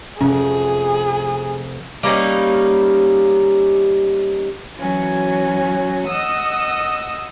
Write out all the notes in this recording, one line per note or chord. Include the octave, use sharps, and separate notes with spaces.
F1 C#4 G#4
G3 A#3 C#4 D#4
E3 F#3 C#4 F#4 G#5
D#5 F#5 D#6 E6